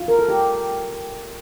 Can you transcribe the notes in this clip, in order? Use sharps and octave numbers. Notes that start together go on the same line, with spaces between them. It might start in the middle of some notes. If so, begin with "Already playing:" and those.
Already playing: F4
A#4
A4
G4